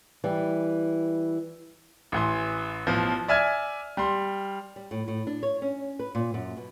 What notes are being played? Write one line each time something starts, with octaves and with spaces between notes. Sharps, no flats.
E3 G3
A1 E3 C6
A1 B2 F3
D5 E5 G#5 F6 G#6
G3 C6
G3
A2
A2
D4
C#5
C#4
B4
A#2
F#2
B2